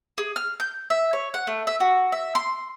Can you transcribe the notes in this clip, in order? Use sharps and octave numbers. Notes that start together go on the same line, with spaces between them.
G#4
F6
G6
E5
C#5
F#5
A3
E5
F#4
E5
C6